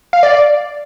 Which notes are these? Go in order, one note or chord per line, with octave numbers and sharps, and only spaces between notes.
F5
D5